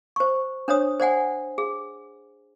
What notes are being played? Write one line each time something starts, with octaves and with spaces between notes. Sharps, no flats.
C5 C#6
D4 C5 C#5 D#6
C5 D5 F#5 G#5
G#4